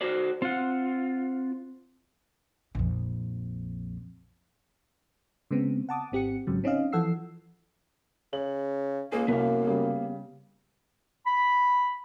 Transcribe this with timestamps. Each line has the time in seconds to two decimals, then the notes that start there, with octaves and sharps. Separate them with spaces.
0.01 F#4 C5 D5
0.42 C4 F4 F#5
2.75 A#1 F2
5.51 C#3 G#3 B3 C4
5.89 F#5 A5 D6 D#6
6.12 G#1 C4 G4 F#5 C#7
6.47 G#1 G#2 C#3 F#3
6.64 C4 C#4 D#4 D#5 F5
6.92 E3 F3 A4 F#5 E6 C7
8.33 C#3 F#7
9.12 C#2 A#3 G#4
9.28 C2 F#2 B3 F5
9.67 C#3 G3
11.27 B5